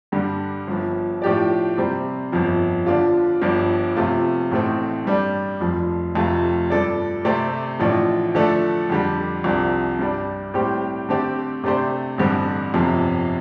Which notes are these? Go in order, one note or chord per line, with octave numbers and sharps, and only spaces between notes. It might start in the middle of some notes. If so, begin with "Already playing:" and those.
G2 D3 G3
G1 G2 F3
A2 F3 D4 G4 D5
C3 G3 C4
G1 F2 F3
D3 F3 D4 F4
G1 G2 F3 D4
C3 F3 A3 F4
A1 A2 A3 C4
G2 G3 D4
F1 F2 F3
F1 F2 C3 A3 F4
G2 F3 D4 A4 D5
C3 A3 C4 G4 D5
A1 A2 F3 D4
D3 F3 A3 D4 A4
F2 D3 G3
C2 C3 F3 D4
G2 G3 D4
A2 G3 C4 G4 C5
D3 A3 C4 G4 D5
C3 A3 D4 G4 C5
A1 G2 D3 G3 C4
G1 F2 C3 F3